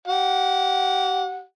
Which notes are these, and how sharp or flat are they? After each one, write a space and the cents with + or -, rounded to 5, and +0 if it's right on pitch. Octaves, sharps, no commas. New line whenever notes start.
G4 -30 F#5 -20